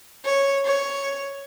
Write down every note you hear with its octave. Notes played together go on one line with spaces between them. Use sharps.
C#5
C#5